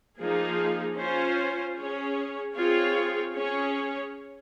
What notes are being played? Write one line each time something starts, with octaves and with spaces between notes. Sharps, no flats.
F3 A#3 D#4 G#4
C#4 F4 C5
C#4 G#4 C#5
C4 F4 G#4 C#5
C#4 G#4 C#5